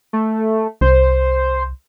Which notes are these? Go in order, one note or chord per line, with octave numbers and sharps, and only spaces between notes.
A3
C2 C5